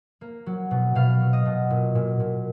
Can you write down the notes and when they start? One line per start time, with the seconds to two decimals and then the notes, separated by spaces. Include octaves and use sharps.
0.21 A#3
0.46 F#3
0.71 B2
0.95 B2 F5
1.20 F#3
1.33 D#5
1.45 B2
1.70 A#2
1.95 A#2
2.20 A#2